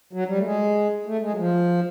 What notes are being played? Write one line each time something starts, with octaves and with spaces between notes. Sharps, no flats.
F#3
G3
A3
G#3
A3
G#3
F#3
F3